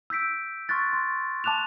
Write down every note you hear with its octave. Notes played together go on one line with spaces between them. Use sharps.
E6 G6 B6 D7
C6 C#6 F6 F#6 A6 B6
C6
A5 D6 F#6 E7 F7